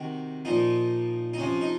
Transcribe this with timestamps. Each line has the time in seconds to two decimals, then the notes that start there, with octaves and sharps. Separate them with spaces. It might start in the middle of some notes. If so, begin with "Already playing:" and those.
Already playing: C3 D#3 F#4
0.45 A#2 F3 D#4
1.33 D#4
1.38 C3 F3 C#4
1.61 D#4